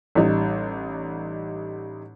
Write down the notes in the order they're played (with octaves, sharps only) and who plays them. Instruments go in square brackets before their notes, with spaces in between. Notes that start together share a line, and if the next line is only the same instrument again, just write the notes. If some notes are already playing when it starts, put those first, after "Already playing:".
[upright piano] A1 G3 D#4